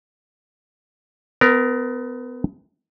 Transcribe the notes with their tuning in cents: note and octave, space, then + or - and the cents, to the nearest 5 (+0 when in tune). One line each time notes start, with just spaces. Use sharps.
B3 +30 A#4 +0